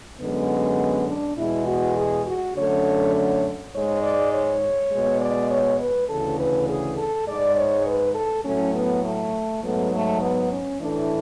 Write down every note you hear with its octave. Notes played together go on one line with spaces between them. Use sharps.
F#2 D3 G#3 B3
D4
E2 B2 G#3 E4
F#4
G#4
F#4
F#2 D3 A3 C#5
C#5
G#2 G#3 C#5
D5
C#5
B2 G#3
D5
C#5
B4
D2 C#3 E3 A4
B4
G#4
A4
G#2 G#3 D5
C#5
B4
A4
A2 F#3 A3 C#4
B3
A3
G#2 F#3 A3 B3
A3
B3
C#4
A2 E3 A3 D4